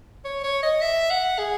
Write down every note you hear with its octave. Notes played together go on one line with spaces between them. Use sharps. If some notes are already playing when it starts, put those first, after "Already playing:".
C#5
C#5
D#5
E5
F#5
G#4